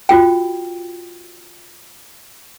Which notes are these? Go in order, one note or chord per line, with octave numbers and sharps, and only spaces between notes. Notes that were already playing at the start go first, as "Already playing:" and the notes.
F4 F#4 G5